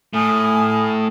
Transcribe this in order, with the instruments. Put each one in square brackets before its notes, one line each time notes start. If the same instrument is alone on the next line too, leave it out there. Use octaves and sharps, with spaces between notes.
[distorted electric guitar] A2 [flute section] G#5 D#6 F6